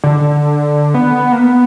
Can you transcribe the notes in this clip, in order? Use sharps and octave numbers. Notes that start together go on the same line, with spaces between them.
D3
B3
A#3
B3